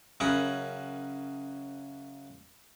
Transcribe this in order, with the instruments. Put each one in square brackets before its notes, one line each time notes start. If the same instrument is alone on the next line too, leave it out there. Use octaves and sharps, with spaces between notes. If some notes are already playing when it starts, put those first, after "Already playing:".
[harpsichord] F#2 C#3 G#4 A#4 F#5 B5